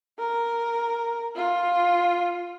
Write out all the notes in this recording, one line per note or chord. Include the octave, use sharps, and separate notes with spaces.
A#4
F4